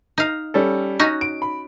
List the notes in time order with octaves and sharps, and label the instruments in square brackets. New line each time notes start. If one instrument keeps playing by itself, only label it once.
[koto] D#4 F5
[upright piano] G3 C#4 A4
[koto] C#4 D#4 F#4
[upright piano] D7
B5